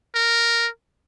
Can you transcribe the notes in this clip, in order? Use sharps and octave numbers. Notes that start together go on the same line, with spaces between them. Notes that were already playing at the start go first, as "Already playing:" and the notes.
A#4